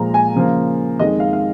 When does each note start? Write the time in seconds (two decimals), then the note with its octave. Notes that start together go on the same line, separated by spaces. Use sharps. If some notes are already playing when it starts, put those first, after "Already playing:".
Already playing: A#2 F3 G#3 A#5
0.14 G#5
0.35 C#3 F3 A#3
0.99 F2 D#3 G#3 D#5
1.20 F5
1.33 F5